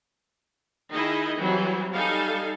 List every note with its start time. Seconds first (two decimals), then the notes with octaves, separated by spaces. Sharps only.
0.92 D#3 D#4 E4 G#4 D#5
1.38 E3 F#3 G3 C4
1.94 G3 D#4 A4 F5 G#5